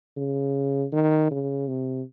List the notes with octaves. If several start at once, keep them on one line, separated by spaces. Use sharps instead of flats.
C#3
D#3
C#3
C3